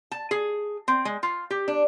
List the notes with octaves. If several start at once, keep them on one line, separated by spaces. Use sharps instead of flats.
A5
G#4
C4
G#3
F4
G4
D4